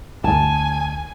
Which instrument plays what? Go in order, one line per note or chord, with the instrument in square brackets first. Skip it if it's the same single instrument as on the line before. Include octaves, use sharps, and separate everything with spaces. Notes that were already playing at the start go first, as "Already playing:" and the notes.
[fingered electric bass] D2 [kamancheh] G#5 [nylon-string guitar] A5